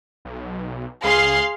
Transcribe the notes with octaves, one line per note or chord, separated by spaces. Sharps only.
B1
C#2 G#4 F5 C6